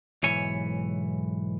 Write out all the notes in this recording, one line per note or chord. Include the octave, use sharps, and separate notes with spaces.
B1 G#2 E3 C#5 G#5